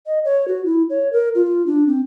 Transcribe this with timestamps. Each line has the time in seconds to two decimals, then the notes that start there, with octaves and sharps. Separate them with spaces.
0.06 D#5
0.25 C#5
0.48 F#4
0.65 E4
0.90 C#5
1.13 A#4
1.35 F4
1.66 D4
1.88 C4